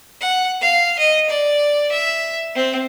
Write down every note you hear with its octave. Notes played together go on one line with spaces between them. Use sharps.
F#5
F5
D#5
D5
E5
C4